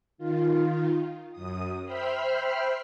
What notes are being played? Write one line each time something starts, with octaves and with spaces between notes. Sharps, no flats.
D#3 F4
F#2 D#6
C5 E5 G5 B5 F6 C7